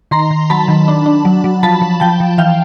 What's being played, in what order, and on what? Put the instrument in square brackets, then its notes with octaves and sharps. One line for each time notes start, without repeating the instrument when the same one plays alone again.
[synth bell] D#3 A#5 C6
D#3
F#3 A5 B5
D#3
D4
D4
F#3
F#3
F3 A5 B5
F3
F3 G5 A5
F3
E3 F5 G5